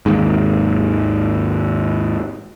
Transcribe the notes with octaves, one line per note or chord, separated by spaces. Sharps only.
G#1 D#2 G#2